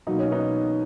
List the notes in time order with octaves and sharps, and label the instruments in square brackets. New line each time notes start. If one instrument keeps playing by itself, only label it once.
[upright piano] B2 F#3 A#3 D#4
C#4
B3 D#4